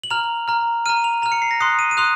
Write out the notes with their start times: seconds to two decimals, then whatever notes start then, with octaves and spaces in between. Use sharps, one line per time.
0.04 F#7
0.10 A#5 F6 F7
0.48 A#5 F6
0.86 A#5 F6 D#7
1.04 F7
1.22 A#5 F7
1.26 F6
1.32 C#7
1.42 C7
1.51 A#6
1.60 C6 D#6 F#6 C7
1.79 D#7
1.91 D#7
1.97 C6 D#6 F#6 F7